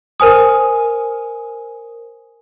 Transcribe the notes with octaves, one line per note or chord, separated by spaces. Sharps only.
A#4 C5 G#5 D#6